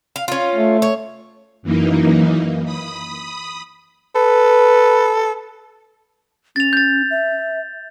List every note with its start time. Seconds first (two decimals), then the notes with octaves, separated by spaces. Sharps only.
0.16 F5
0.28 C#4 F4
0.55 A3
0.82 C#5
1.62 F#2 E3 A#3 D#4
2.65 B5 D#6
4.16 A4 B4
6.56 C#4 A6 F7
6.73 G6 A6
7.11 E5